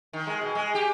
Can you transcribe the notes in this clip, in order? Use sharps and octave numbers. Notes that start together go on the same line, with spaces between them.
D#3
G#3
B2
G#3
G4